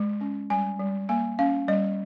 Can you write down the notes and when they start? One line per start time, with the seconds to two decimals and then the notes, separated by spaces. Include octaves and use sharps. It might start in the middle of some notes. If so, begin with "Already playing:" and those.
Already playing: G#3
0.21 C#4
0.50 G3 G#5
0.79 G3
1.09 A#3 G#5
1.39 C#4 F5
1.68 G3 D#5